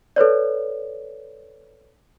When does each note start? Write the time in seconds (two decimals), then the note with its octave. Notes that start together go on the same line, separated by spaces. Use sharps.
0.16 A4 B4 C#5 D5